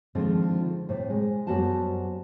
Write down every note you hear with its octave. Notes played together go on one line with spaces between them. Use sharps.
D3 D#3 F3 G#3 C4 F4
A2 C3
G#3
F#2 G3 B3 F#4 C5 A5